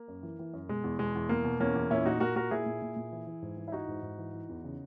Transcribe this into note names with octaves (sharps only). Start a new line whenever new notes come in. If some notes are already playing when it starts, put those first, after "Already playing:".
Already playing: A#3
F#2
E3
E3
F#2
B2 G#3
E2
B2 G#3
E2
B2 A#3
B2
E2 A#3 C#4
E2
A#2 C#4 E4
A#2 D#4 F#4
A#2 F#4 A#4
A#2 F#4 A#4
A#2 E4 G#4
A#2
A#2
A#2
E3
E3
G#2
E3
E4
E3 D#4 F#4
G#2
G#2
E3
E3
E2
C#3